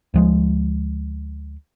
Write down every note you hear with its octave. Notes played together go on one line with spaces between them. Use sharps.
D2 F3 G#3